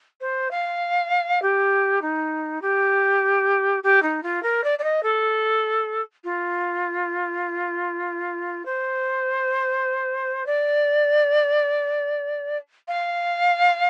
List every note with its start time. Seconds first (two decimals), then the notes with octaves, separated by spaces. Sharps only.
0.21 C5
0.51 F5
1.42 G4
2.02 D#4
2.62 G4
3.83 G4
4.02 D#4
4.23 F4
4.43 A#4
4.64 D5
4.79 D5
4.84 D#5
5.03 A4
6.24 F4
8.65 C5
10.46 D5
12.88 F5